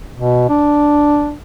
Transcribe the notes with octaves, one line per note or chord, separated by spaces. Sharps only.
B2
D4